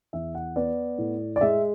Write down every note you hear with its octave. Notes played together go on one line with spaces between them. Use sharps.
E2 E5
F#5
B3 D5
A2
D5
G#3 E5